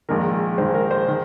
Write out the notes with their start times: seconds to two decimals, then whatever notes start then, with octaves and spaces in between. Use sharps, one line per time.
0.09 A#1 G#2 D#3 A#4
0.58 A#1 G#2 D#3 C5
0.74 A#4
0.91 C5
1.08 D#3